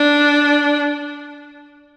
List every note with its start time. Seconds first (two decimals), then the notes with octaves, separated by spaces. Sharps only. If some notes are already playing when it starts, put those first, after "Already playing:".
Already playing: D4